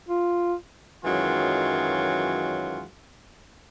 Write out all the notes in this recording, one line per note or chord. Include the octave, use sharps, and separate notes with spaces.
F4
F#2 D#3 E3 F#3 G#3 F4